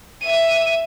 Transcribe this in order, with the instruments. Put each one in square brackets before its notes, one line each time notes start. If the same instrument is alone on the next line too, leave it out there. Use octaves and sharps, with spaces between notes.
[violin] E5 D#7